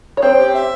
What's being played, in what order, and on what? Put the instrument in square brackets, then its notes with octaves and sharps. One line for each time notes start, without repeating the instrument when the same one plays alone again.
[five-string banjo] C#5
[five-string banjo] C4 C5 [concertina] G5
[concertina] G4
E5